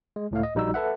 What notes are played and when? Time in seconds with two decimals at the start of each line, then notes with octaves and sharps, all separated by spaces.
0.16 G#3
0.31 C#2 A2 A3 F5
0.43 D#5
0.55 A#1 G3 D#4 F#4 E6
0.74 A4 B4 E5 F#5